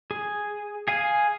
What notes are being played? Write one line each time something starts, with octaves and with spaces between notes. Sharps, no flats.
G#4
G#4 F5 G#5